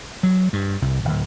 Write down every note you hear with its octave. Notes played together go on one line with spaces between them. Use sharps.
F#3
G2
C2
D1